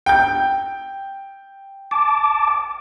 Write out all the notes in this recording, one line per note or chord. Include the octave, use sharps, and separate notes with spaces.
G5 G6
A5 D6